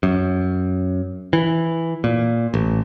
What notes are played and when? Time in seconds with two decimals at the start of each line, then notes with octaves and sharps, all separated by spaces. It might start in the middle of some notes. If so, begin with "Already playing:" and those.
0.03 F#2
1.33 E3
2.04 A#2
2.54 A1